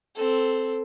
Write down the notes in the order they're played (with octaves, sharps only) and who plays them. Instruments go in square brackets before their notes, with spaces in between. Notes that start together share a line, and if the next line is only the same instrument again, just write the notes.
[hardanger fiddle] C4 A4